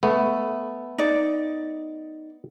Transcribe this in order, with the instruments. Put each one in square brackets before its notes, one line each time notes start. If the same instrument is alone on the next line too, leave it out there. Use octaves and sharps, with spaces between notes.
[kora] A3 [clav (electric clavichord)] B3
[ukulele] D#4 D5